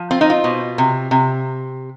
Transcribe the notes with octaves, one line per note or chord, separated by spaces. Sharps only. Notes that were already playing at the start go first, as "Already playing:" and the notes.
Already playing: F3
C4 F4
D#4
F4
B2
C3
C3